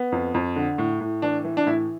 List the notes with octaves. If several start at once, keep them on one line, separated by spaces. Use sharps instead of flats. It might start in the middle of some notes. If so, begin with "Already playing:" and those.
Already playing: B3
F2
F2
D3
A2
A2
E3 D4
E3
D4
A2 E4